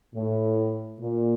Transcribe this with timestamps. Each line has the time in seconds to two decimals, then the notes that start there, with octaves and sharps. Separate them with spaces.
0.15 A2
1.00 A#2